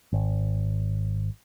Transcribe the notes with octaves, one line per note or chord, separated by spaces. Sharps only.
G#1